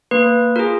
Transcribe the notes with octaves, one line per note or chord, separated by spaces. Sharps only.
A#3 B4
F4 G#4 A#4